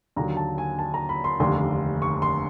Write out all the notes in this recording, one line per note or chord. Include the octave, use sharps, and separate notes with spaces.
D#2 D3 F#3 A#5
A5
G#5
A5
A#5
B5
C6
F1 D#2 D3 C6
C#6
C6